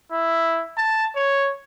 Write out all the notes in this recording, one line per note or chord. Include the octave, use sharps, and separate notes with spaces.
E4
A5
C#5